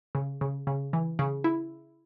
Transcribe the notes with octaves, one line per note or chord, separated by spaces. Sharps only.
C#3
C#3
C#3
E3
C#3
E4